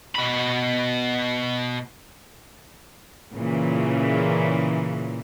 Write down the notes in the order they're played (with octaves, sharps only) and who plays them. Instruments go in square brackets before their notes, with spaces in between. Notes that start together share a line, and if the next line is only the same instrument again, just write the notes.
[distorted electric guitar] B2 B5
[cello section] A#2 C#3 E3